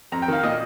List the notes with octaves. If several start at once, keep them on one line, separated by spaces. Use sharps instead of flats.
F2 A#5
G5
D#3 F5
A#2 D#5